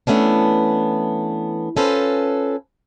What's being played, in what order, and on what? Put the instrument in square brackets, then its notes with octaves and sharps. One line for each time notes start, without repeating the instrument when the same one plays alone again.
[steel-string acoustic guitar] E3 A3 B3 C#4 D4
C#4 F4 A4 B4 C5